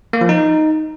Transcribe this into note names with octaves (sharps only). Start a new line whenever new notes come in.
A#3
F3
D#4